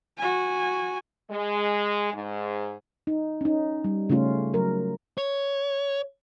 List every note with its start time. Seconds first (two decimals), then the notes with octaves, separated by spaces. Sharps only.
0.18 F#4 G#5
1.31 G#3
2.14 G#2
3.07 D#4
3.41 C#4 D#4
3.84 G3
4.10 C#3 A3 C#4 F4
4.54 F#3 A#4
5.18 C#5